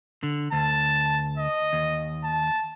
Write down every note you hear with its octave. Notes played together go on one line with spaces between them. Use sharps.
D3
D2 A5
D#5
D#2
A5